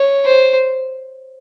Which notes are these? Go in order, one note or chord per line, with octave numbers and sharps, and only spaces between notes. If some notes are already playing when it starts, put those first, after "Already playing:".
Already playing: C#5
C5